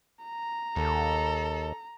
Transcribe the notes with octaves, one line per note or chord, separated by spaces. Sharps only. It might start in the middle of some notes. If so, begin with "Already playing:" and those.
A#5
D#2 A4